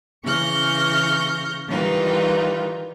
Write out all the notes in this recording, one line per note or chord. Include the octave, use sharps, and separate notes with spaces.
C#3 E3 C#6 F6 G6 A#6
D#3 E3 G3 D#4 F4 B4